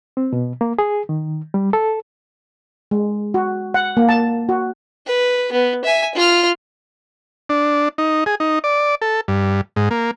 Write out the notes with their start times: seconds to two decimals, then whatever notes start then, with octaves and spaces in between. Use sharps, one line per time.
0.17 C4
0.33 B2
0.61 A#3
0.79 G#4
1.09 D#3
1.54 G3
1.73 A4
2.91 G#3
3.34 F#4
3.74 F#5
3.97 A#3
4.09 A5
4.49 F#4
5.07 B4
5.52 B3
5.85 E5 G#5
6.15 F4 F6
7.49 D4
7.98 D#4
8.26 G#4
8.40 D#4
8.64 D5
9.02 A4
9.28 G2
9.76 G#2
9.91 A#3